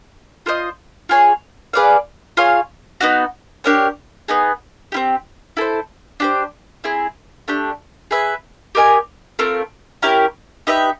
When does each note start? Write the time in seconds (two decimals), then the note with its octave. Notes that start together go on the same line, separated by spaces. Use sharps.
0.46 F4 A4 C5 D#5
1.09 F4 G#4 C#5
1.73 G#4 B4 D5 F5
2.37 F4 G#4 C#5 F5
3.01 B3 D#4 F#4
3.64 D4 G4 A#4 C#5
4.28 B3 D#4 G#4
4.92 C4 E4 G4
5.57 E4 A4 C5
6.20 D4 G4 C5
6.84 C4 E4 G#4
7.48 A3 D4 G4
8.11 G#4 B4 E5
8.75 G4 A#4 D#5 G#5
9.39 A3 C4 F4 A#4
10.02 C#4 E4 G4 A#4
10.67 D#4 G4 B4 E5